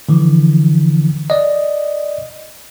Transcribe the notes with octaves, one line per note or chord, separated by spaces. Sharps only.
D3 E3 F3
D5 D#5